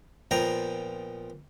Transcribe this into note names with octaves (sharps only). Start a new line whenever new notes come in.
A#2 F3 B3 G5 A#5